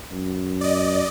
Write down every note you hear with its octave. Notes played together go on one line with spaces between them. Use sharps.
F#2
D5 D#5